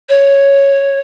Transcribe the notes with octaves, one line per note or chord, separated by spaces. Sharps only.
C#5